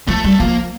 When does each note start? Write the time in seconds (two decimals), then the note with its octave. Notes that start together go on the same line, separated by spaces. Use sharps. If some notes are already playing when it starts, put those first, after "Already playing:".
0.08 F3 A3
0.24 G3
0.40 F3 A#3